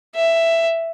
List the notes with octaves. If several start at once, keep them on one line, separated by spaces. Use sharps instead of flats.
E5